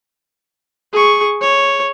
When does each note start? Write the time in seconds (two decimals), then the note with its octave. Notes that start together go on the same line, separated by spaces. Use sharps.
0.93 G#4 C#6
1.41 C#5